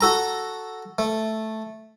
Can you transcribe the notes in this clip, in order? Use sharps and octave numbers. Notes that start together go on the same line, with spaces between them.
F#4 A4 A#5
A3